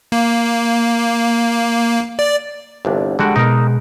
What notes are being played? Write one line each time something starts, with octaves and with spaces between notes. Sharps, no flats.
A#3
D5
G1 C2 D4
D3 G3 G#3 F#4 F#6 D7
B2 D#4 A#4